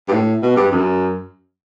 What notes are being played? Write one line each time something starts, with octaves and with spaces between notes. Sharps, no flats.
G2
A2
B2
G2
F#2